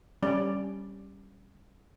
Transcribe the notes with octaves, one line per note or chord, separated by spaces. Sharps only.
G3 C#4 D5